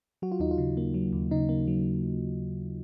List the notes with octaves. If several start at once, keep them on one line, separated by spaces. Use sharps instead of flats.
F#3 F#4
F4
D#2 D#4
F4
C#3
A#3
F#3
D#2
C#3 D#4
A#3
F#3